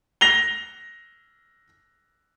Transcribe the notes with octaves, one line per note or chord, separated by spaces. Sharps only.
A#6 F7 G7